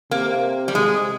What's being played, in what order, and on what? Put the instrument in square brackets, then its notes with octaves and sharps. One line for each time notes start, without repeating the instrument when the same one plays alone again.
[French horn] C3 [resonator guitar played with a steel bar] A#3
[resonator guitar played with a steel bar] G3
[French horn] C3 [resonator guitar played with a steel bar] G#3